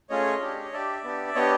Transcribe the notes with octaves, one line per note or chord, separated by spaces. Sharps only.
A3 C#4 F4 G#4 C#5 D#5
D4 G4
D4 G4 D5 E5
B3 D4 G4
B3 D4 G4 C#5 D#5